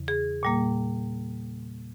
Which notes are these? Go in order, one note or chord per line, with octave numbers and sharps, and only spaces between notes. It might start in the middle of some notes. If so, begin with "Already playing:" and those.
Already playing: E2 C#3 E3
G#4
A#2 G3 A#3